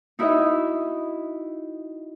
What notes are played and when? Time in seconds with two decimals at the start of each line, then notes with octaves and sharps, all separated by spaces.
0.19 D#4 E4 F#4 D#5 E5